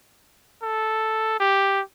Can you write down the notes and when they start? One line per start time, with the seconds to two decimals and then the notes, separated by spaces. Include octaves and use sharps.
0.62 A4
1.40 G4